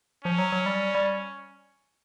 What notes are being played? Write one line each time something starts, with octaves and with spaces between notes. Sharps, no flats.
F3 C#4
F#3
F#3
G3
G3